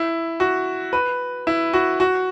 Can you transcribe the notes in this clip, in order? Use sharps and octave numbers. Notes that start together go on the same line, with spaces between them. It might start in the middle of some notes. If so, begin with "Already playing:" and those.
Already playing: E4
F#4
B4
E4
F#4
F#4